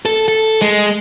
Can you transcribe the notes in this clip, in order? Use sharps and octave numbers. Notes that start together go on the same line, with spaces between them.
A4
A4
G#3